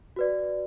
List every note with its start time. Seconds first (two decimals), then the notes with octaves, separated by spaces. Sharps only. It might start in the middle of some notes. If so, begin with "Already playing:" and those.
0.16 F#4 B4 D5